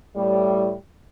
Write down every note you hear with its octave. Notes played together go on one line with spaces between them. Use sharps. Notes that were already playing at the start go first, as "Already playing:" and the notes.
A2 G3